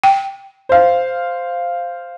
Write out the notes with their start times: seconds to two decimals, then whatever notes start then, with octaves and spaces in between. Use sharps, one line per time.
0.04 G5
0.69 C5 F5